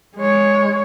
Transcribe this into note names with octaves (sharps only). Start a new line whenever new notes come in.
G#3 C#5